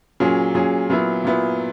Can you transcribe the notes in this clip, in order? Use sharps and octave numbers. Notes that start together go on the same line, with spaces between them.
A#2 F#3 C#4 G#4
A#2 F#3 C#4 G#4
A#2 F#3 B3 E4
A#2 F#3 B3 E4